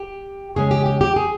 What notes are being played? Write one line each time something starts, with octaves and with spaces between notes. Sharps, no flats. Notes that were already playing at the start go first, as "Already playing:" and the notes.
Already playing: G4
C#3 G#3 C#4 G#4
G4
G4
G4
G#4